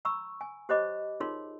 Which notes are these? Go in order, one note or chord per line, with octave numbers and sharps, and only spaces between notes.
A#5 B5 C#6 E6
G#5
G4 C5 C#5 D#5 B5 D6
D#4 F4 G#4 A#4 C#5 C6